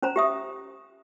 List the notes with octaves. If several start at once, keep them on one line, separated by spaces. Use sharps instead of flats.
C#4 C5 A#5
G4 E5 D#6